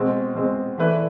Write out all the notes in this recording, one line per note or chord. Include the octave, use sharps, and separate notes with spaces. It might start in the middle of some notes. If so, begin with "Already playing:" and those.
Already playing: B2 G#3 C4
B2 G#3 C4
E3 A3 E4 B4 D5